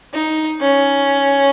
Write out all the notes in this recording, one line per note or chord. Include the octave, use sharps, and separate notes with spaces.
D#4
C#4